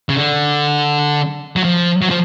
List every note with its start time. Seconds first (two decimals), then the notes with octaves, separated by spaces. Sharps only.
0.09 C#3
0.15 D3
1.56 F#3
1.64 F3
2.02 F#3
2.10 F3